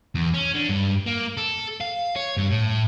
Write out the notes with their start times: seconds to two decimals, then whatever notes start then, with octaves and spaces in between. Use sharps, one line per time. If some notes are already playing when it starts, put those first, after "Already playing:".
0.15 E2
0.34 C#4
0.54 D3
0.69 G2
1.06 A#3
1.37 A4
1.80 F5
2.16 C#5
2.37 G2
2.51 A2